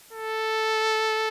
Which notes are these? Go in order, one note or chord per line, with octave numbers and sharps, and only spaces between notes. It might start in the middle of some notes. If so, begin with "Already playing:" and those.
A4